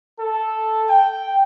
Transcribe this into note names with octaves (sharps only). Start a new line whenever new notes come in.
A4
G5